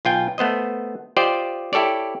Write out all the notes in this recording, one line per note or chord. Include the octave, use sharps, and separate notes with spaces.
B1 F4 G5 G#5
A3 B3 C5 D#5
F4 G4 C5 D5 D#5
E4 G4 A4 C#5 D5